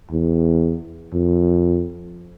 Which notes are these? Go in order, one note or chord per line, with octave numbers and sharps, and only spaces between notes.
E2
F2